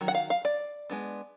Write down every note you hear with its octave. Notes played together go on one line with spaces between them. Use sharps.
D#3 F#3
F#5
F5
F5
D5
G#3 B3 D4